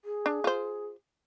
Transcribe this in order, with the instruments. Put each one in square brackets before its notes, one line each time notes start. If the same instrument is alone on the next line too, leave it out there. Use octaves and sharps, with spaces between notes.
[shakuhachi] G#4
[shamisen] D4
F4 C5